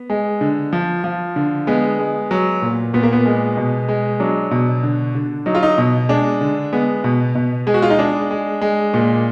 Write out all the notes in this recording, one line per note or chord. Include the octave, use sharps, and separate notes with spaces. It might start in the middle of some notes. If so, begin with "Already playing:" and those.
Already playing: B3
G#3
D3
F3
F3
D3
G#3 B3
G#3
F#3
A#2
A#2 B3
A#3
B3
G#3
B2
G#3
F#3 D4
B2
D3
D3
F#3 D#4
F4
D#4
B2
G#3 D4
D3
G#3 B3
B2
B2
G#3 G#4
F#4
F4
D#4
G#3 D4
G#3
G#3
A#2